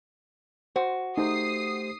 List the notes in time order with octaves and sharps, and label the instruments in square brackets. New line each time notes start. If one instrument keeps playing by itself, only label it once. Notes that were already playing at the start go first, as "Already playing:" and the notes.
[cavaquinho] F#4 [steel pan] C5
[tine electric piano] A3 G4 C5 [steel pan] D#4 [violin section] D#6 C7